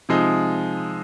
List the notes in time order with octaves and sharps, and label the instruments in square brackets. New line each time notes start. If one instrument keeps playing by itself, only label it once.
[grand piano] C3 F3 G#3 D#4